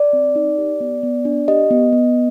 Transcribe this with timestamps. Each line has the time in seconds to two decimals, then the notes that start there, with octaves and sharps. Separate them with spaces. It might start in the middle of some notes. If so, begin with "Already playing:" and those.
Already playing: D5
0.13 C4
0.36 D#4
0.58 G4
0.80 B3
1.03 B3
1.25 D4
1.48 G4 D#5
1.71 B3
1.92 B3